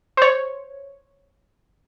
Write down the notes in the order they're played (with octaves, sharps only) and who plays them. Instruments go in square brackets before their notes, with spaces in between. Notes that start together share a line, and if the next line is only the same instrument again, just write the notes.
[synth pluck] C5 C#5